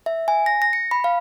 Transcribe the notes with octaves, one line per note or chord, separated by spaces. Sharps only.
E5
G#5
A#6
A#6
C#7
B5
F5